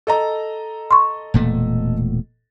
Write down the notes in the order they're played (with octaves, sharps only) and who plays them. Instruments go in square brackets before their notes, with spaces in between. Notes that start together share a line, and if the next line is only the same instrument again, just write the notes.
[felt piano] A4 D#5 A#5
[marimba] C6 C#6
[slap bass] E1 A#2 A3